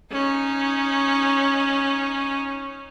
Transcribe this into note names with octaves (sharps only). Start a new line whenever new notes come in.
C#4 D#4